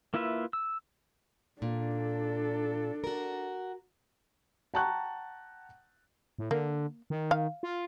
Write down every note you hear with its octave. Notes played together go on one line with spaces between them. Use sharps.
A#3 E4 F4 B4 E5
E6
A#2 D4 A4
F#4 A#4
F#5 G5 A5 A#5 C#6 F#6
A2
D3 A#3
D#3
F5
F4